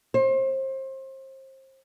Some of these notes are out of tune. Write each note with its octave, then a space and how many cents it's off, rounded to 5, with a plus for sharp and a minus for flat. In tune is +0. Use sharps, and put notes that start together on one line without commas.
C5 +30